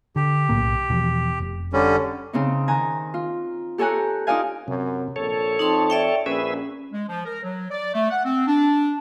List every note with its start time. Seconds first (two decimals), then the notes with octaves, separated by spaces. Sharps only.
0.16 D3 G4
0.49 B1 A2 A#3
0.90 E2 B2 F3
1.40 F1
1.73 D3 G3 C#4
2.33 C#3 C4 D#4
2.68 D#3 G#5 A#5 F#6
3.14 F4
3.78 G4 A4 C#5 G#5 A#5 F#6
4.27 D#4 F4 D5 D#5 F5 G#5
4.68 F#2 C3
5.16 A#1 A4 C#5
5.59 F2 D#4 A5 C6
5.90 D5 E5 G5
6.26 A#1 C#4 G#4 B4 E5
6.93 G#3
7.09 F3
7.25 A#4
7.43 F#3
7.71 D5
7.94 A3
8.11 F#5
8.24 C4
8.47 D4